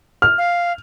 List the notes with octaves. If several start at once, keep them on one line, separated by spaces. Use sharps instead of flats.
F6
F5